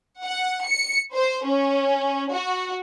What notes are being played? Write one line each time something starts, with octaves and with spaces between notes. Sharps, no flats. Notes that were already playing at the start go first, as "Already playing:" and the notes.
F#5
C#7
C5
C#4
F#4